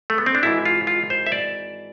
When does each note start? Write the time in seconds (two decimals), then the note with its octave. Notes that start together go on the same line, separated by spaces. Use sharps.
0.10 A3
0.18 B3
0.26 C4
0.35 D4
0.43 G#1 G#2 E3 E4
0.65 F4
0.87 F4
1.10 C5
1.26 E5
1.32 D5